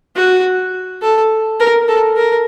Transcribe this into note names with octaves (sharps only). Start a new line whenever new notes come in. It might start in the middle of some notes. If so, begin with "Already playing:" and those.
F#4
A4
A#4
A4
A#4